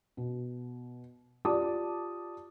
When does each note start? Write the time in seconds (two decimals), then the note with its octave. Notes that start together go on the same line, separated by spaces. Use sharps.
0.17 B2
1.45 F4 G4 D5 A5 D6 D#6